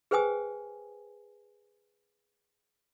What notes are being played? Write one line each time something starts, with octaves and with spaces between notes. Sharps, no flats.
G#4 B4 C5 G5 G#5 D#6